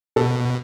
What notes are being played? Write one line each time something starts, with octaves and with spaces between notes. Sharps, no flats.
B2 A4